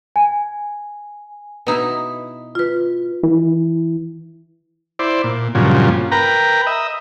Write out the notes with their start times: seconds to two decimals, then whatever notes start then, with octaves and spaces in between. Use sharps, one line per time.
0.16 G#5
1.67 B2 D#4 E4
2.55 F4 B4
3.23 E3
4.99 E4 C5 D5
5.24 A#2
5.55 G2 A#2 C#3 F3 F#3
6.12 A#4 B4 G5 A#5
6.67 D#5 E5